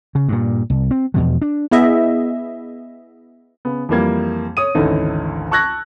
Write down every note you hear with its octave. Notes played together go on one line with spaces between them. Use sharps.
C#3
G2 A#2
C2
C4
E2 B2 F3
D4
B3 E4 G#4 D#5 E5
C#3 B3
F2 E3 G3 A#3 G#6
C#5 D#6 D#7
G#1 D2 E3 C#4 D#4 A4
A5 C#6 E6 F#6 G#6 A#6